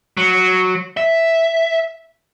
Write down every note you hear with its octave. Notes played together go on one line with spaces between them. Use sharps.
F#3
E5